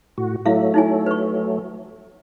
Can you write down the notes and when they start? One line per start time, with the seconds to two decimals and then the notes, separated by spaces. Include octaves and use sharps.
0.18 A2 F#4
0.46 F#3 A3 E4 E5 F5
0.74 D#4 E4 G#5
1.06 B4 C#6